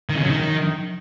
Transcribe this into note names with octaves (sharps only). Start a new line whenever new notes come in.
D#3
C#3
F#3
D#3